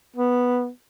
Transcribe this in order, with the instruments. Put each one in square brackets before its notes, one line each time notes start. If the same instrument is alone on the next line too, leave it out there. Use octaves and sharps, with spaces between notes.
[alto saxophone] B3